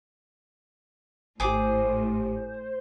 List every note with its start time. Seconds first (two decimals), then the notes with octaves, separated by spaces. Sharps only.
1.40 G#1 A2 G4 G#4 C5 D6